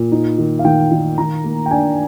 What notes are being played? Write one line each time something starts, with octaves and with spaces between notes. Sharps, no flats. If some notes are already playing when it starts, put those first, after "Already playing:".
Already playing: A#2
D#4
D#3
F5
D#3 G5
D#3
D#3 A#5
A#3
G5
D4 G#5